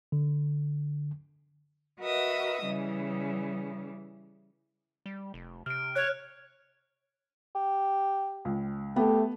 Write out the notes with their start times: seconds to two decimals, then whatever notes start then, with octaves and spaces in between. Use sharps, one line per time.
0.12 D3
2.00 F#4 A#4 B4 D#5 E5 D#6
2.63 C#3 E3 G3
5.06 G3
5.34 F1
5.66 C3 F6 D7
5.95 C#5 F#6
7.55 G4
8.45 C#2
8.96 A3 B3 G4